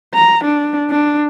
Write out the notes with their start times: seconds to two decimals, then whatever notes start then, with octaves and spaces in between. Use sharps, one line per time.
0.14 A#5
0.44 D4
0.90 D4